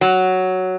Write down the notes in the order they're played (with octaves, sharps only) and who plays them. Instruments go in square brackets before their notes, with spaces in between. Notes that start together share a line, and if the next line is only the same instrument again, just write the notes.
[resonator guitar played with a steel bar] F#3